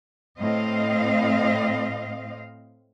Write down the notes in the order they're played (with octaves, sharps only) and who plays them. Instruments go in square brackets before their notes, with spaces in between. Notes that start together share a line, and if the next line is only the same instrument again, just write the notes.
[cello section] A2 C4 D#5 F5